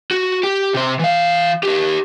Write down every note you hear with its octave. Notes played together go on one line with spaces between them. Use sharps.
F#4
G4
C3 C5
E3 F5
D#4 G4